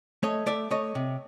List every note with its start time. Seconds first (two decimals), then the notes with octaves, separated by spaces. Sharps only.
0.23 A3 C#5 D#5
0.46 A3 D5 E5
0.71 A3 C#5 D#5
0.95 C3